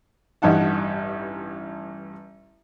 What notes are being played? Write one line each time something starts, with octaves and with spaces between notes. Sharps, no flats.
A1 G2 D#4 F#5 A5